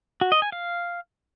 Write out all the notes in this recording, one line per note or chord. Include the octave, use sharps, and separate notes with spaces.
F#4
D#5
G#5
F5